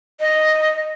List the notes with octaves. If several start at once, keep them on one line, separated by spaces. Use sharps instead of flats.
D#5